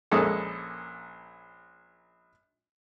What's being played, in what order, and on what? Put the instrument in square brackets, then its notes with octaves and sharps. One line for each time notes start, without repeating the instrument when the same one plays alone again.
[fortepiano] A#1 G#3 A#3 C#4 A4 D#6